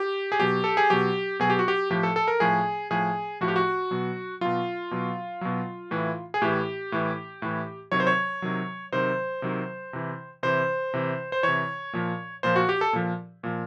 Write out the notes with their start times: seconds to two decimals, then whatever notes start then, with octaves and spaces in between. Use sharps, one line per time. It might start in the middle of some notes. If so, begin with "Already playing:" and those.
Already playing: G4
0.32 G#4
0.40 B2 F#3 G4
0.64 A4
0.77 G#4
0.90 B2 F#3 G4
1.40 B2 F#3 G#4
1.50 G4
1.59 F#4
1.68 G4
1.90 A2 F3 G4
2.03 A4
2.16 A4
2.28 A#4
2.40 A2 F3 G#4
2.91 A2 F3 G#4
3.41 A2 F3 F#4
3.48 G4
3.56 F#4
3.91 B2 F#3
4.41 B2 F#3 F4
4.91 B2 F#3
5.41 B2 F#3
5.91 A2 E3
6.34 G#4
6.42 A2 E3 G4
6.92 A2 E3
7.42 A2 E3
7.92 C3 D#3 F#3 C#5
8.00 C5
8.07 C#5
8.42 C3 D#3 F#3
8.92 C3 D#3 F#3 C5
9.42 C3 D#3 F#3
9.93 C3 E3
10.43 C3 E3 C5
10.94 C3 E3
11.32 C5
11.43 C3 E3 C#5
11.93 A#2 F3
12.43 A#2 F3 C5
12.56 F#4
12.69 G4
12.81 A4
12.93 A#2 F3
13.43 A#2 F3